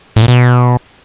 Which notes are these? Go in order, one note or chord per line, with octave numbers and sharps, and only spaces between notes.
A2
A#2
B2